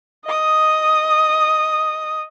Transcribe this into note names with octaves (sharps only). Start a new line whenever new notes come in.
D#5 D#6